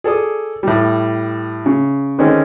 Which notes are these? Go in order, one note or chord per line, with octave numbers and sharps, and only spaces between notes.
G#4 A4 D5 D#6
A2 G3
C#3
D3 D#3 G#3 C4 C#4